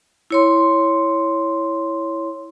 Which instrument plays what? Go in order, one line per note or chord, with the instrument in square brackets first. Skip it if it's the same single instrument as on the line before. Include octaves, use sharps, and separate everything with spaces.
[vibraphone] E4 C#5 C6